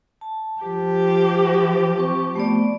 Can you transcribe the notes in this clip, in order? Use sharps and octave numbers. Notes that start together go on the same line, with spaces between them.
A5
F3 G4
C4 C#6
A3 B3 D5